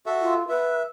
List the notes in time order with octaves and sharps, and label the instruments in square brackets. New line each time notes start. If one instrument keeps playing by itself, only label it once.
[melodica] F#4 A4 E5
[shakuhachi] F4
[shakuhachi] B4 [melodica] E5